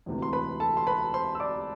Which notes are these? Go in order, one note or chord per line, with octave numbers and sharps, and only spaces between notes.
E1 D2 C3 E3
C6
B4 B5
A4 A5
C6
B4 B5
C5 C6
E6
D5 D6